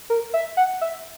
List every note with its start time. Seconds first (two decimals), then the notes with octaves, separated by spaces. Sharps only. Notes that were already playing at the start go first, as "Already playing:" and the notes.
0.10 A#4
0.34 E5
0.57 F#5
0.81 E5